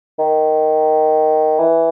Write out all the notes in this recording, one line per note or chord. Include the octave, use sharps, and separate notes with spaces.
D#3
E3